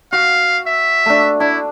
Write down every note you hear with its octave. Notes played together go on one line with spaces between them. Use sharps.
F#4 F5
E5
A3 D4
D4 E4